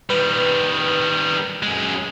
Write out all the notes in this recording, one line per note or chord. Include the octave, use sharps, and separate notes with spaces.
D#3 G3 B4
F#2 G#3